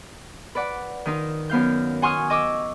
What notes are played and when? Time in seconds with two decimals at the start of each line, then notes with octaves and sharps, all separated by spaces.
0.55 B4 D5 F#5
1.05 D#3 D#4 F4
1.50 F#2 B3 F5 G6
2.02 F#5 G#5 C6 C#6 D#6 F6
2.30 D#5 C#6 D6 E6